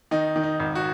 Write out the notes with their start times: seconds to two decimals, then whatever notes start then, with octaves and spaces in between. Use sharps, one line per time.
0.11 D#3 D#4
0.36 D#3
0.43 D#4
0.60 G#1
0.75 F#4